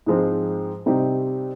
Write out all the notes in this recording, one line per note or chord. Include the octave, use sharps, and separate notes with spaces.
G#2 F3 G#3 C4
C3 G3 C4 D#4 G4